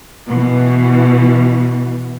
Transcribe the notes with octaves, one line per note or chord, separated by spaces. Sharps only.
B2 E3